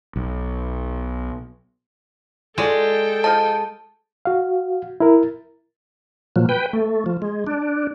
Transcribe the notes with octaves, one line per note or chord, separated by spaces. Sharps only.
B1
G#3 F4 F#4 A4 D5 G5
F3 D#5 A5
F#4 F5
E4 A#4
A#2 F3 F#3
B4 G5
A3
F3
G#3
D4